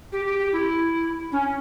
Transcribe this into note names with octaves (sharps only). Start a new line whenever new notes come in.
G4
G4
G4
E4
C#4